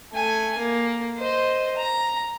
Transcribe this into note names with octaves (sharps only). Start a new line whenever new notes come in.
A3 G#5
A#3
C5 D#5
A#5